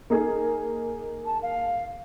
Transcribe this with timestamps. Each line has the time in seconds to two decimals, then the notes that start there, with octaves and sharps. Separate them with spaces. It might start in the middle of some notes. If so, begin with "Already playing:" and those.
0.10 A#3 D#4 G#4
1.25 A5
1.42 F5